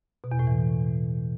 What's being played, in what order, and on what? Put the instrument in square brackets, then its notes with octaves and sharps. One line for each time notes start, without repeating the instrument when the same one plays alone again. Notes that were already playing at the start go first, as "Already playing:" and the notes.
[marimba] B2
E2
A2
E3